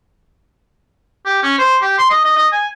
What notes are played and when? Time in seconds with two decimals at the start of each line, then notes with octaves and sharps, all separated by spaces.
1.26 G4
1.43 C#4
1.58 C5
1.82 G4
1.98 C6
2.10 D#5
2.24 D#5
2.36 D#5
2.52 G#5